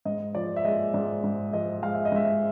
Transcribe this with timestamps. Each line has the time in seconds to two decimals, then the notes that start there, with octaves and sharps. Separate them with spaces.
0.05 G#2 D#5
0.35 F3 D5
0.56 E5
0.64 G#3 D#5
0.94 G#2 D5
1.24 G#2
1.53 F3 D#5
1.82 G#3 F5
1.94 E5
2.05 D#5
2.12 G#2 E5